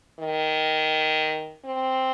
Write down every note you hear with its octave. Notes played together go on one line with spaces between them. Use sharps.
D#3
C4